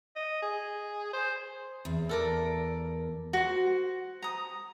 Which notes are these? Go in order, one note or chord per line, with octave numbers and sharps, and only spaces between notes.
D#5
G#4
C5
E2
A4 A#4 D5
F#4 C5
A#5 D#6